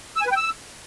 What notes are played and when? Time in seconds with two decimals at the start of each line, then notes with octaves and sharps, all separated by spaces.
0.16 E6
0.21 G#5
0.26 B4
0.31 G5
0.36 E6